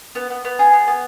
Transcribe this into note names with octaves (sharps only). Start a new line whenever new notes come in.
B3
B3
B3
G#4
B3
B3